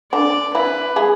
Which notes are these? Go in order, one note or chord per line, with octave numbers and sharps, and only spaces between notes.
D3 D4 D5
E3 E4 B4
G#3 G#4